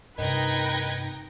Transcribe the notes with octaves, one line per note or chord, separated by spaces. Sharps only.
G2 C3 D#3 D#4 B4 G5 G#6 A#6